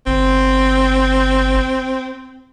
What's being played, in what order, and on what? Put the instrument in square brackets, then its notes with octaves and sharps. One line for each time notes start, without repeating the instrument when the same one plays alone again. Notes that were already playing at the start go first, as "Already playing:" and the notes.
[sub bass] G1 [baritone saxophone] C4